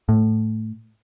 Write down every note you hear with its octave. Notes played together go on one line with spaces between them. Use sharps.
A2